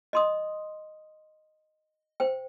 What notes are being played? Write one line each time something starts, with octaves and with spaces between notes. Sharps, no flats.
D#5 C6 D#6
C5 G5